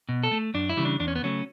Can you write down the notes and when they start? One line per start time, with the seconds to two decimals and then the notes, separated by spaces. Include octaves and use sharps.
0.09 B2
0.23 A4
0.32 A3
0.54 F#2 D4
0.69 E4
0.77 C#3 E3 G3
0.85 D4
1.00 E2 D4
1.08 C#4
1.15 B3
1.23 C#3 F#3 A3 C#4